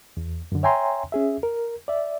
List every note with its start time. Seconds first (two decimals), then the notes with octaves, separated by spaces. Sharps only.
0.17 E2
0.52 F#2 D3
0.63 C#5 E5 G5 G#5 A#5 C6
1.12 C#4 G#4 E5
1.43 A#4
1.88 D5 E5